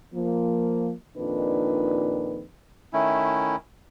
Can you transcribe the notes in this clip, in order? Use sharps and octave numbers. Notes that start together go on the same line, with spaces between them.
F3 A#3
F2 A#2 D#3 D4 D#4 B4
D#3 A3 C#4 E4